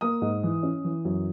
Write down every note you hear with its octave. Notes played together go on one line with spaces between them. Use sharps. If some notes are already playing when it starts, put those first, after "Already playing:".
A#3 D#6
G#2
E3
C#4
E3
F#2